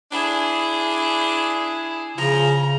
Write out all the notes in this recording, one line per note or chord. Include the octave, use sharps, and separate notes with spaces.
D4 E4 G#4
C#3 F3 A#5